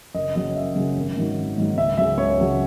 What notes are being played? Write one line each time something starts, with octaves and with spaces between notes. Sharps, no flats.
F#1 D#5
F#2 C#3 F#3 D#5
F#1 E5
F#2 C#3 F#3
G#1
G#2 D#3 F#3
G#1
G#2 D#3 F#3
C#2 E5
C#3 F#3 E5
C#2 C#5
C#3 F#3